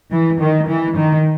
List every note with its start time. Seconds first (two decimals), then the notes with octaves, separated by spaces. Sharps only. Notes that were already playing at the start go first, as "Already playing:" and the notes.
0.11 E3
0.40 D#3
0.68 E3
0.97 D#3